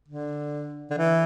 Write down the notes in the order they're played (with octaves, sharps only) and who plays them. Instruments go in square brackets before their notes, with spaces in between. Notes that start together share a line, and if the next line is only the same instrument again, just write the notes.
[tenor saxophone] D3
D3
E3